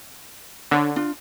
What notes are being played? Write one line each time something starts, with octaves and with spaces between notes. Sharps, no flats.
D3 D4 C#5
D4 F4